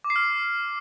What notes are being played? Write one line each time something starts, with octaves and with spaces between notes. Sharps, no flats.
D6
C7
F6